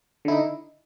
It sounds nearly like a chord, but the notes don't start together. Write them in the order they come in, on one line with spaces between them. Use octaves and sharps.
D3 E4 D#4